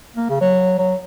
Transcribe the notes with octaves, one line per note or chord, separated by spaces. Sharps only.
A#3
C#3
F#3
F#3